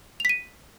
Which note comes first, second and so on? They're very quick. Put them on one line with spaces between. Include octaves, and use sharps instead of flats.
F7 B6 D#7